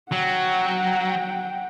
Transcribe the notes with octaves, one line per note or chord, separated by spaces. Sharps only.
F#3 F#5 G5